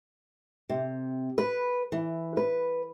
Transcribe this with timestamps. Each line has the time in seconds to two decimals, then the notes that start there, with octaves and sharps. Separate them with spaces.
0.69 C3
1.38 B4
1.92 E3
2.37 B4